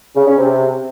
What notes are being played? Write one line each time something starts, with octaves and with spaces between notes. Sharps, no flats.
C#3
C#4
C3